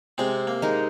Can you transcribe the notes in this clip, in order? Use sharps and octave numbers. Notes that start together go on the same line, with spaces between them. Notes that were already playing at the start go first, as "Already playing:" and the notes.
C3 G#3 C4
A#3
G#3 D#4 A#4